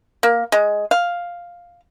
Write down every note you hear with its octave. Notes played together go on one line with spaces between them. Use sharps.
A#3
G#3
F5